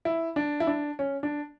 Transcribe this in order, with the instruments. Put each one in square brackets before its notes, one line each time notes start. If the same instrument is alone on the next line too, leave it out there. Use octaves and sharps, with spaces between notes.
[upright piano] E4
D4
E4
D4
C#4
D4